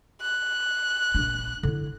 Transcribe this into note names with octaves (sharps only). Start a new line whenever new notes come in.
F#6
A#1 D4
D3 E4